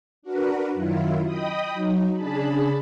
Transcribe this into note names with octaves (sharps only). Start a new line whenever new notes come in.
D4 F#4 A#4 B4
F#2 D#3 F#3 E4 F4
D#5 G5 B5 D#6
F#3 D#4
C#3 D4 G#4 A5 B5